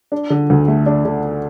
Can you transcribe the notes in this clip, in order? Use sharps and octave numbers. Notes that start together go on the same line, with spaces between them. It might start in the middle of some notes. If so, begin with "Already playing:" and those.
D4
D3
D2
A3
D4
D3